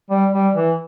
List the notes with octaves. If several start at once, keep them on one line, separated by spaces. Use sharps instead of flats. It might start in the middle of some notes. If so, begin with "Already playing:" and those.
G3
G3
E3